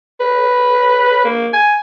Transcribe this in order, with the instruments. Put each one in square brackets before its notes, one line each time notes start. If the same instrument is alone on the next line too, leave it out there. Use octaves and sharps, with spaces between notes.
[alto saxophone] B4
A#3
G#5